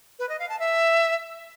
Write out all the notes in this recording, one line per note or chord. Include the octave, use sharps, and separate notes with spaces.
B4
D#5
F5
A5
E5